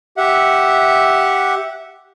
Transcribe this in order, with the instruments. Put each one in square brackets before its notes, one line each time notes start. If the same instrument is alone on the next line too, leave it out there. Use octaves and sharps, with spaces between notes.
[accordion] G4 E5 F#5